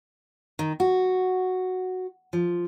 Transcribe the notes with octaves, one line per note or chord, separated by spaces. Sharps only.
D#3
F#4
F3